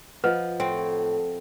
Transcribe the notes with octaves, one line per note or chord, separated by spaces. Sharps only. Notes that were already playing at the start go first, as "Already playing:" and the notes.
F3 F4 B4 D#5 F#5
A2 C4